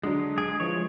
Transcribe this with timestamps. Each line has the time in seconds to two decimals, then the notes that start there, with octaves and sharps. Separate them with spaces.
0.03 D3 F#3 G#3 D4
0.38 G#4 D7
0.60 E3 F3 C#5